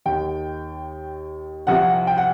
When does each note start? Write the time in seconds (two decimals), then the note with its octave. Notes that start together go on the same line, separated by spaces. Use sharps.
0.05 D#2 D#3 G5
1.67 C2 C3 F3 F#5
2.07 G5
2.17 F#5